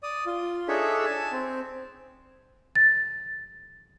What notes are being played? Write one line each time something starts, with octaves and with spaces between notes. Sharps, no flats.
D5 D#6
F4
D4 D#4 G#4 A4 C#5 E5
G#5 A5
C4
A6